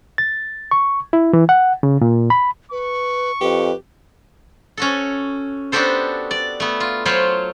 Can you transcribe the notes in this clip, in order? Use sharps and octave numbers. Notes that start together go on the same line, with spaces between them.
A6
C#6
E4
E3
F#5
C#3
A#2
B5
B4 C#6
F2 G4 B4
C#4 F#4 A4
B3 D4 F#4 G4 A4 C5
D5
A3 B3
F4
F#3 F4 C5 C#5 F5 B5